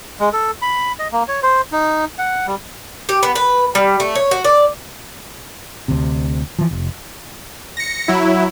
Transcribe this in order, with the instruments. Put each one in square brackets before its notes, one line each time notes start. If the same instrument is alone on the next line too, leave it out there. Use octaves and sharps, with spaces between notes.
[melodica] G#3
A4
B5
D#5
A#3
C#5
C5
D#4
F#5
G3
[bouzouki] G4
B3
B4
G3
A3
C#5
F#4
D5
[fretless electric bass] D2 C3
E3 F3
F1
[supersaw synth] A#6 C#7
F#3 E4